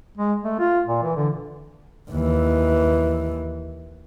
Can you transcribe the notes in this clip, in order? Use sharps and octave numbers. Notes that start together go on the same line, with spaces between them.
G#3
A3
F4
A#2
E3
D3
D#2 E3